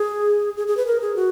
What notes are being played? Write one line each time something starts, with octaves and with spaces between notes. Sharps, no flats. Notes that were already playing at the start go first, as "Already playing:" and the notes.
Already playing: G#4
G#4
G#4
B4
A#4
G#4
F#4